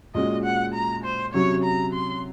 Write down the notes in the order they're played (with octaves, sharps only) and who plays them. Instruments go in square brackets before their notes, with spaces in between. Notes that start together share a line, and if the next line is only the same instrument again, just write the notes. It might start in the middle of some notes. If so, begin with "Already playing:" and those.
[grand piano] A#2 G#3 C#4 F#4 [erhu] D#5
[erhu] F#5
A#5
C5
[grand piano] C3 F#3 C#4 F#4 [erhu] C#5
[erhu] A#5
C6